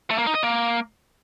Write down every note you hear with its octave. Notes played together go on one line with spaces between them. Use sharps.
A3
A#3
D#4
D#5
A#3